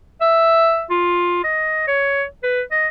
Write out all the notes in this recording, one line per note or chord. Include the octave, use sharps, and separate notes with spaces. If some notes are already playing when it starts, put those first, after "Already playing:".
E5
F4
D#5
C#5
B4
D#5